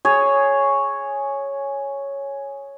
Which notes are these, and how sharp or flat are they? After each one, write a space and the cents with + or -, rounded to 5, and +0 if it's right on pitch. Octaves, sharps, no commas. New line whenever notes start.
G#4 +0 C#5 +0